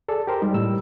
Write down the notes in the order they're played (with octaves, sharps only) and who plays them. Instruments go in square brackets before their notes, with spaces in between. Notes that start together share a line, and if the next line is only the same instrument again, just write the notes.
[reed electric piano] G#4 A4 D5
G4 A#4 C5
[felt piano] G3 [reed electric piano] D#4
[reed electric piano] A2 E6